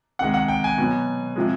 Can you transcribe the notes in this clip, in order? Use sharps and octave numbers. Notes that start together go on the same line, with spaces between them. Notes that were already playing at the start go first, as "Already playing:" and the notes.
C3 D#3 G#3 F#5
F#5
G5
G#5
B2 F#3
C3 F3 G#3